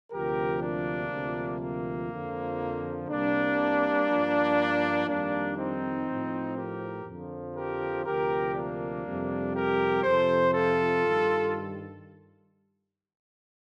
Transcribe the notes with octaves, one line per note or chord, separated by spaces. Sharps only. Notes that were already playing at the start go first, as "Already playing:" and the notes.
D2 C3 F3 G4 A#4
A#3 D4
D2 C3 F3
A#3
F2 D3 F3
C2 C3 G3 A#3 D4
G2 F3
F2 D#3 G3 A#3 D4
C4 D#4
A2 F3
G4 A#4
F2 D3 F3
G4 A#4
D2 C3 F3 G4 A#4
A#3 D4
F2 C3 G3
G4 A#4
F2 C3 F3 A4 C5
F4 A4
G2 D#3 G3